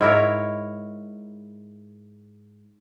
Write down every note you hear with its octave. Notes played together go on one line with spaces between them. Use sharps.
G#2 E4 A#4 C#5